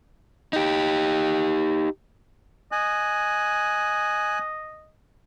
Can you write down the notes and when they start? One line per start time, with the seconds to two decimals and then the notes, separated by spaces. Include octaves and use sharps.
0.53 D#4 G4
2.72 D#5 G#5 F#6